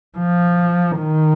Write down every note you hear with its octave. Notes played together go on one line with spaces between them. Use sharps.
F3
D#3